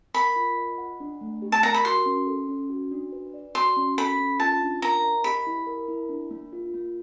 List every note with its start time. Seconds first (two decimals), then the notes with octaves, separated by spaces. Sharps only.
0.14 A#4 B5
0.36 F4
0.58 D#5
0.78 F#5
1.00 D4
1.21 A3
1.42 G4
1.52 A5
1.63 A#4 A#5
1.74 B5
1.85 F#4 C6
2.06 C#4
2.27 A4
2.48 C#4
2.69 F#4
2.91 D4
3.12 B4
3.34 D5
3.55 F#4 C6
3.77 C#4
3.98 A4 B5
4.18 C#4
4.40 F4 A5
4.61 D4
4.82 A#4 A#5
5.04 D#5
5.24 G4 B5
5.47 E4
5.67 A#4
5.88 E4
6.09 D4
6.31 A#3
6.53 F4
6.74 A#3